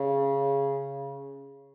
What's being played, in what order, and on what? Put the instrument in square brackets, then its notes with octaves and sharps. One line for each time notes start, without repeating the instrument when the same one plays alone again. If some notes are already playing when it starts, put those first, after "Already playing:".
Already playing: [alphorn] C#3